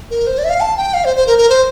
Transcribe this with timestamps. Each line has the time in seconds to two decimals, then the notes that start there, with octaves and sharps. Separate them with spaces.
0.11 A#4
0.27 C5
0.38 D5
0.44 E5
0.49 F5
0.60 A5
0.77 G5
0.94 F5
1.05 C5
1.16 C5
1.27 A#4
1.38 A#4
1.49 C5